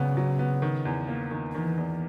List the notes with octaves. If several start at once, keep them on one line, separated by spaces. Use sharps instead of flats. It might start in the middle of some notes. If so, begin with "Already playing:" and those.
Already playing: G#1 G#2 C#3 F#3 B3
F#3
B3
D#3
E2
A#3
D#3
D#3 E3
E2